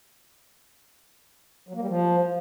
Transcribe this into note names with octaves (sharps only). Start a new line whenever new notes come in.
F#3
A#3
G3
F3